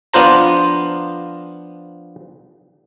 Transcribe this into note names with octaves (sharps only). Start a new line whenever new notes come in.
F3 B3 D4 F4 C5 A#5